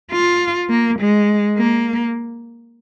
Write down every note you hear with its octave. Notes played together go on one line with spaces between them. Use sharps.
F4
A#3
G#3
A#3